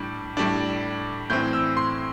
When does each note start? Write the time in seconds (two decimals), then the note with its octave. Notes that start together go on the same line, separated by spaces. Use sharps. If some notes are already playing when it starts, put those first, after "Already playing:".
Already playing: A2 G3 D4
0.37 A2 G3 D4
1.30 A2 E3 C4 G6
1.53 E6
1.77 C6